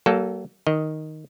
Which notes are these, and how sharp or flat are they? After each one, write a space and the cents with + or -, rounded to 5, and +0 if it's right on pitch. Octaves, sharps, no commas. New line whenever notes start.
F#3 +45 A#3 +0 A4 -5
D#3 +0 D#5 +0